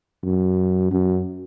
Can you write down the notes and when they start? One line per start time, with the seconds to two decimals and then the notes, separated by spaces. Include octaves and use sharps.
0.23 F#2
0.92 F#2